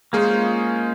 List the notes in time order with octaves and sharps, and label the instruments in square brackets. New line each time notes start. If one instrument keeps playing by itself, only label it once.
[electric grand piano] G#3 G#4 [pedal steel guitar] A#3 C#4 F4 C5